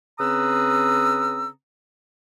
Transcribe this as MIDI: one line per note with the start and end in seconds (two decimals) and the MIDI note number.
0.19 1.48 49
0.19 1.48 60
0.19 1.48 71
0.19 1.48 82
0.19 1.48 87
0.19 1.48 88